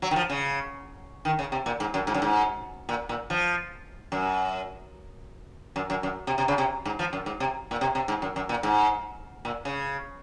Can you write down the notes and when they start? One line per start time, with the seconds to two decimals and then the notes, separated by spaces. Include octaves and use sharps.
0.02 F#3
0.11 D#3
0.16 F3
0.30 C#3
1.25 D#3
1.39 C#3
1.52 C3
1.66 A#2
1.80 G#2
1.94 F#2
2.07 G#2
2.14 F#2
2.22 G#2
2.89 A#2
3.09 A#2
3.30 F3
4.12 F#2
5.76 F#2
5.90 F#2
6.03 F#2
6.27 C3
6.38 C3
6.48 C#3
6.58 C3
6.85 G#2
6.99 F3
7.13 F#2
7.26 G#2
7.40 C3
7.71 A#2
7.81 C3
7.95 C3
8.08 G#2
8.22 F#2
8.36 F#2
8.49 A#2
8.63 G#2
9.45 A#2
9.65 C#3